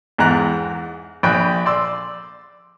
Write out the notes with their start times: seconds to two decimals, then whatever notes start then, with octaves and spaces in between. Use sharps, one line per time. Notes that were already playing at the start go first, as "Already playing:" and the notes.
0.18 E2 G#2 G5 A#5 F#6
1.23 A#1 G5 B5 F#6
1.65 D5 C6 E6